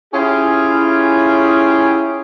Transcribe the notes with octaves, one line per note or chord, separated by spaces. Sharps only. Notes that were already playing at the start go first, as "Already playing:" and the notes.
C#4 E4 F4 G4 G#4